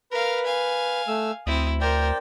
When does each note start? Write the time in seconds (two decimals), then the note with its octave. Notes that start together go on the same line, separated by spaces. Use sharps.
0.12 A#4 B4 F5
0.46 F5 G#5
1.08 A3 E6
1.46 D2 C4 E4 D#6
1.81 A#4 C5 D5 G5